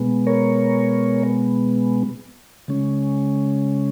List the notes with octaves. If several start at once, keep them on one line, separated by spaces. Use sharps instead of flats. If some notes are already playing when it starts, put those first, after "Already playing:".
Already playing: B2 G#3 B3
A#4 C#5
C#3 G#3 C#4